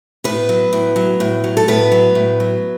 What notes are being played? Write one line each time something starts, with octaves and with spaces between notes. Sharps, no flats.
A2 B3 B4
F#3
A2
F#3
A2
F#3
A4
A2 B3 B4
F#3
A2
F#3